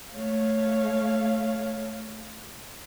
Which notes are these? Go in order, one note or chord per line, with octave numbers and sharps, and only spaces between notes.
A3 C#5 F5